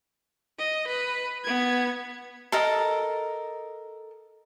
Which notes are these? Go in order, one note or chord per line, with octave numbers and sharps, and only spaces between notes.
D#5
B4
B3 G#6
A4 A#4 D#5